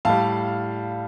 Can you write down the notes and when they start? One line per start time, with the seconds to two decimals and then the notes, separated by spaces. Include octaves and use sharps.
0.05 A2 G3 F5 A5